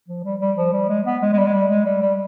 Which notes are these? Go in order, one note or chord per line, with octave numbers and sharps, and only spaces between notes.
F3
G3
G3
F3
G3
G#3
B3
G#3
G#3
G3
G#3
G3
G#3
G3
G3